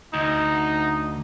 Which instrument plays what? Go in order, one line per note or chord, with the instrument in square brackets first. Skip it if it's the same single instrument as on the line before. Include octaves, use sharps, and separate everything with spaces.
[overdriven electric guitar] D2 [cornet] D#4